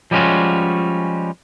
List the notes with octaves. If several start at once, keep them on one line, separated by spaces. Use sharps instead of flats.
F3 G3 G#3 C#4 F4 F#4